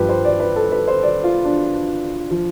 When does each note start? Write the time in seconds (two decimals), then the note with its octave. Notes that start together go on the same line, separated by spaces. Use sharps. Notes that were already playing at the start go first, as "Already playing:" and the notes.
Already playing: G2 F3 G4 B4
0.09 C5
0.25 D5
0.40 B4
0.56 A4
0.72 B4
0.87 C5
1.03 D5
1.24 F4
1.45 D4
2.31 F3